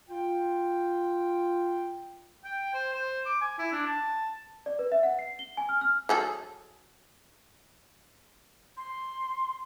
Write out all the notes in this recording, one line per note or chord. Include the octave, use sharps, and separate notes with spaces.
F4 G5
G5
C5
C5
D6
G#5
E4
D4
A5
D5
B4
E5
F#5
C7
G7
G#5
F6
F6
F#3 G#4 A4
C6